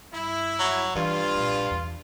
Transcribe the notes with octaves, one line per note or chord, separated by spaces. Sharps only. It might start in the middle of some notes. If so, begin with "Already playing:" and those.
G2 E4
F#3
G2 E3 F4
A#1 C4
E2